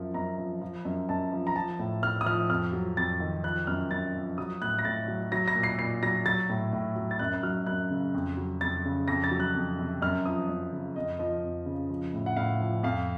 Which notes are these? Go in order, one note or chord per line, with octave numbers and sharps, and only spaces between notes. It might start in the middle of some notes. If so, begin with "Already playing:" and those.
Already playing: F#2 F3
F#2 A#5
F3
F3
F#2
F#2 A5
F3
A#5
F3 A5
A2
A2 F6
D#6
F3 F6
F2 F6
F#3
F2 A6
D#3
F3 F#6
F#2 F6
F#2 A6
F3
F#3 D#6
A2 F#6
A#6
A2 A6
F#3
F#3 A#6
A#6
A#2
C7
A#2 C7
F#3 A#6
F#3 A6
A2
A2
F#3
A6
F#2 F#6
F#6
F#3 F6
F#2 F#6
C#3
F2
F#3
F2 A6
C#3
F2 A#6
A6
F#3
F#6
F2
C3
F#2 F6
F3 D#6
F#2
C#3
F2 D#5
F3 D#5
F2
C#3
F3
A2
F#5
A2 F5
F3
F2 F5